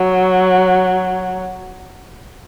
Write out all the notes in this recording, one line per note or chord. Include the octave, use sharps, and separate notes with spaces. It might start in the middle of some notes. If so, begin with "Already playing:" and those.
Already playing: F#3